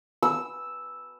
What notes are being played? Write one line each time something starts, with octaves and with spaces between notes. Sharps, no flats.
E6